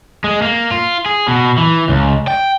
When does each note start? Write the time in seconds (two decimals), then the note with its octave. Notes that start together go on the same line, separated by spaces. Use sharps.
0.24 G#3
0.42 A#3
0.71 F4
1.06 G#4
1.28 B2
1.58 E3
1.89 C#2
2.27 G5